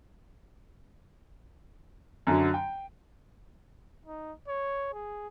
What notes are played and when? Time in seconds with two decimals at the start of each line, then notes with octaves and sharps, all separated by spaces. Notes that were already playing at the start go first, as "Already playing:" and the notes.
2.27 F#2 D3 F#3
2.54 G5
4.06 D#4
4.48 C#5
4.93 G#4